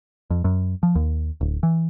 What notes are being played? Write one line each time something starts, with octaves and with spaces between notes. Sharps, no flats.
F2
F#2
F3
D#2
D1
E3